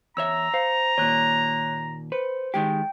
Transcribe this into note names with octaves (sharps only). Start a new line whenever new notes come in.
E2 C#5 E5 A#5 E6
C5 F5
D#2 A#2 C#5 F#6
B4 C5
D#3 G#3 G4 G5